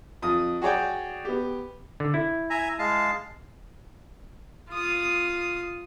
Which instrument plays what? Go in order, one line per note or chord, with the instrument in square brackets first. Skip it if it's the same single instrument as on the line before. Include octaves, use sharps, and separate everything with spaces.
[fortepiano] F2 D#6
F#4 G#4 C#5 D5 G5
B3 G4
[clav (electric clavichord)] D3
E4
[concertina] E5 G#5 A#5
G#3 F5 A5
[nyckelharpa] F4 D#6